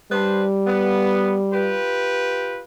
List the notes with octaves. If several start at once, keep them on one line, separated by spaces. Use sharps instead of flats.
G3 D4 B4 C5
B3
F4 G4 B4